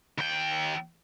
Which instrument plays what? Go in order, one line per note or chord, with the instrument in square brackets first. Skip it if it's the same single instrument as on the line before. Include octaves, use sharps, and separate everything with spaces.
[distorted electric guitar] D#2 G5